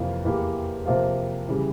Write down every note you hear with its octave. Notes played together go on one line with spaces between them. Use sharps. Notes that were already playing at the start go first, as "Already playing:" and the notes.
Already playing: F2 C3 E3 A#3 F4
E2 E3 A#3 E4 G4
C3 F3 A#3 F4
C#3 E3 G3